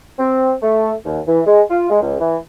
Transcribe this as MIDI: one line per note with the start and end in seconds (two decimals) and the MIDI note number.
0.19 0.53 60
0.63 0.92 57
1.05 1.20 39
1.27 1.41 52
1.46 1.62 56
1.70 1.90 65
1.90 2.01 56
2.02 2.16 37
2.20 2.37 52